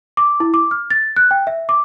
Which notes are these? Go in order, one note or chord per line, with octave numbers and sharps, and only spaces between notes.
D6
E4
D6
F6
A6
F#6
G5
E5
D6